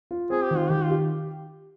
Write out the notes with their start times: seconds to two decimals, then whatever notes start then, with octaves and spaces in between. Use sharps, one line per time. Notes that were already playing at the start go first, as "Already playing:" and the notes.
0.11 F4
0.30 C4 G#4
0.44 G4
0.51 D#3
0.57 F4
0.70 D#3 G4
0.84 F4
0.91 G4